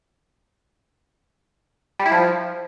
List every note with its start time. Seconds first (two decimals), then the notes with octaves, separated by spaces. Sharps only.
1.99 G3
2.06 E4
2.12 F3